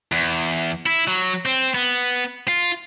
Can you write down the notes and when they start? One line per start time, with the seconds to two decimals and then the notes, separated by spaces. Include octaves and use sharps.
0.12 E2
0.86 E4
1.08 F#3
1.45 C4
1.75 B3
2.48 F4